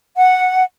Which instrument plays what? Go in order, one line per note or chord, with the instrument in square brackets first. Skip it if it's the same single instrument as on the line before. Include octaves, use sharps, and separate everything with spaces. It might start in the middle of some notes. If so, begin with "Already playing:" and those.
[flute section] F#5